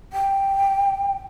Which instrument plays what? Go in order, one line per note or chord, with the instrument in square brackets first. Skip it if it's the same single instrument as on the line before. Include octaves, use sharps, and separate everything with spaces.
[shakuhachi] G5